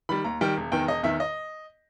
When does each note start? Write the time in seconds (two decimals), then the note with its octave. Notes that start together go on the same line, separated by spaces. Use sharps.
0.09 D#3 G3 B5
0.24 D#2 A#5
0.41 D#3 G3 G5
0.57 E1
0.72 E2 D#3 G5
0.88 E1 D#5
1.03 E2 D#3 E5
1.20 D#5